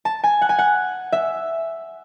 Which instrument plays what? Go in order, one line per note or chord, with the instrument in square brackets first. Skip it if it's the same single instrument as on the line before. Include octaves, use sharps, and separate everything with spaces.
[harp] A5
G#5
F#5
G#5
F#5
E5